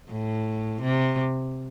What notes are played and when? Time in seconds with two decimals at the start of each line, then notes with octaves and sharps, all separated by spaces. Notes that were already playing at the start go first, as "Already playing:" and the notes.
0.11 A2
0.81 C3